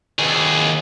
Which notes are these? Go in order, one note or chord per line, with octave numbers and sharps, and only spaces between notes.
D#2 G#4